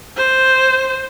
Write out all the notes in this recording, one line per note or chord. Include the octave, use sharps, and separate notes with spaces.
C5